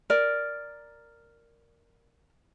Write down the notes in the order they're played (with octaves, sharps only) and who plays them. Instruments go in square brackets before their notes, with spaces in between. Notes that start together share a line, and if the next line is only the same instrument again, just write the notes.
[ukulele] A#4 D5